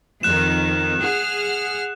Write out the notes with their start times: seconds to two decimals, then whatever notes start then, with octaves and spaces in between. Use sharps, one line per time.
0.23 F2 D#3 F#6 E7
1.02 G#4 F#5 F6